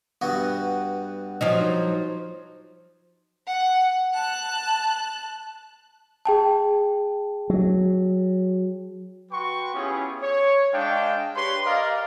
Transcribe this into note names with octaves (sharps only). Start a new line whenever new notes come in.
G2 B3 F#4
F3 F#3 D#4
F#5
A5 F#6
G#4 G5 A5
F#3
F#4 B4 G5 C6 C#6
B3 C#4 E4 F4 G4 G#4
C#5
G#3 D4 D#5 F5 G5
D4 G4 B4 C#5 C6
G4 A#4 D5 D#5 F5